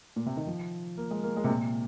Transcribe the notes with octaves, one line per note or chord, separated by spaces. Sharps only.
A#2
C3
D#3
F3
A#3
G#3
A#3
G#3
C3
A#2